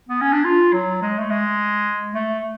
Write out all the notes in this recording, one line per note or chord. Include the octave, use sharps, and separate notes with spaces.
B3
C#4
D4
F4
F#3
G#3
A3
G#3
A3